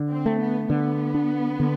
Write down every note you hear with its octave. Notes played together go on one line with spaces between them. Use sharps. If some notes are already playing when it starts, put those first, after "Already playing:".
Already playing: D3
C4
A3
B3
D3 B3
D4
D3